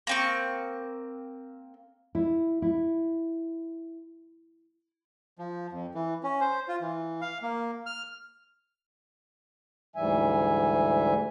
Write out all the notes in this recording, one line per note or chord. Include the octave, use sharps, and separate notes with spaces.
A#3 C4 C#6
E4
E4
F3
F2
E3
C#4
C5
F4
E3
F5
A#3
F6
D2 G#2 E3 G3 E5 G#5